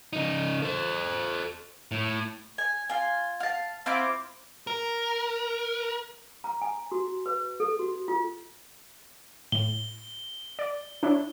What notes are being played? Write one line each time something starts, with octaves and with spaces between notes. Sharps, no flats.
C#3 D#4
A4 C5
A2
G#5
F4 G#5
F5 A5
C4 E4 F4 D6
A#4
A#5
G#5
F#4
B4
A4
F#4
F4
A2 G7
D5
D4 E4 C#5